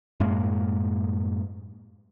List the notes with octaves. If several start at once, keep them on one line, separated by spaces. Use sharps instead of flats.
F#2 A2 G#3 A#3